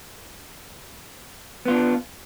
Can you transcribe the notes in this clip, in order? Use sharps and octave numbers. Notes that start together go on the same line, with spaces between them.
B3 D4 F4